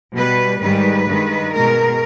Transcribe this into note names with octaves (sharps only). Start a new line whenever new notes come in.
B2 G3 B4
G#2 D#3 G3 B4
G2 D#3 G#3
B2 G#3 A#4